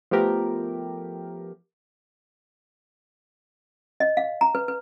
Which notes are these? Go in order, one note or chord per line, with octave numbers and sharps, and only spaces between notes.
F3 A3 B3 G4 A#4
D#5
F5
A#5
B4
B4